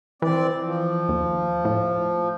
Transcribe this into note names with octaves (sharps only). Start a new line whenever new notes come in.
E3 C4 D5
F3
D#2
A2